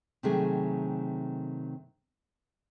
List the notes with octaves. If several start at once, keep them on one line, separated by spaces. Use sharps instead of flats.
C3 D#3 F#3 A3 G#4